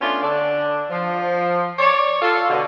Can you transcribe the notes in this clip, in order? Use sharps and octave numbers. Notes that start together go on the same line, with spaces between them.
A3 B3 C#4 D4 F4
D3 D4
F3
C#5 D5
F4 A4
B2 D3